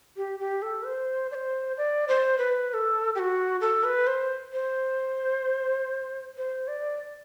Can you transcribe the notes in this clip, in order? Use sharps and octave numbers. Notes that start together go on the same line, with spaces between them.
G4
G4
A4
C5
D5
C5
D5
C5
B4
B4
A4
G4
F#4
A4
B4
C5
C5
C5
D5